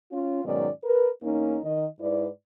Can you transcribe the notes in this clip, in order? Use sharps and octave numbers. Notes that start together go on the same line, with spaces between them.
C#4 F4
G#2 B2 D#3 F#3 C#4 D5
A#4 B4
E2 A#3 C#4 D#4
D#3 D#5
G#2 E4 B4 D5